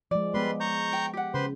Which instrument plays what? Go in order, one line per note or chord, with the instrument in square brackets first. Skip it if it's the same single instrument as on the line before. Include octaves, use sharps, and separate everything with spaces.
[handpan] F3 G#3 [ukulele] D5
[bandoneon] G3 B4 C6 [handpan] G#3 B3
[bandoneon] A#5 C#6 G6
[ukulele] G5
G4 F#5
[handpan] C#3 [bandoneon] B4 C5 C6